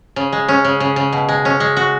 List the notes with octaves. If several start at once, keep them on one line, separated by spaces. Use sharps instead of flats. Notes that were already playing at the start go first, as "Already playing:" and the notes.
C#3
G#3
C#4
C#3
C#3
C#3
B2
G#3
C#4
G#3
F#4